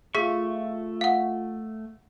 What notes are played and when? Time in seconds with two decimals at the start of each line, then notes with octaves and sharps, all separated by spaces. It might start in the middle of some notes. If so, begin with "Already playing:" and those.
0.15 A3 F4 G#4 E5 C#6 B6
1.01 F5 F#5